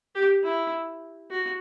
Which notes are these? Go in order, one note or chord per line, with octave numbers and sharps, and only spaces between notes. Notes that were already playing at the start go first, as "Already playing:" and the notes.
G4
E4
F#4